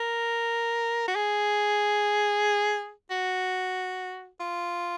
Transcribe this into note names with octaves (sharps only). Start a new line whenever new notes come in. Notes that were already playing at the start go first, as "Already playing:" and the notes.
Already playing: A#4
F#4
G#4
F#4
F4